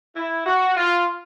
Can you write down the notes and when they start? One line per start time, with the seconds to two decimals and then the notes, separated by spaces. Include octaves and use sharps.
0.16 E4
0.46 F#4
0.77 F4